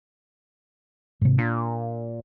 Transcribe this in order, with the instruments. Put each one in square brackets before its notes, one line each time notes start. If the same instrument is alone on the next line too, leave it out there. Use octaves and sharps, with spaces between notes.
[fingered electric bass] G#2 C3
[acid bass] A#2 [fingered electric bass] D4